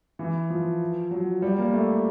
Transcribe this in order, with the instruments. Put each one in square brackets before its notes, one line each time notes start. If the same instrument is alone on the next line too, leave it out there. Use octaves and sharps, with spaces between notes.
[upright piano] E3
F3
F#3
G3
A#3
A3